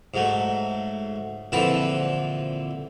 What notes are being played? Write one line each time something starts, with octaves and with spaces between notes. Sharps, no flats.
G#2 F#3 A3
A#1 D3 E3 C4 A5 B5